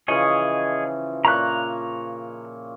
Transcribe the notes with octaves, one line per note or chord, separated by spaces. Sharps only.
C#3 E3 F3 G#4 C#5 D#5
A#2 C#5 A#5 C#6 F#6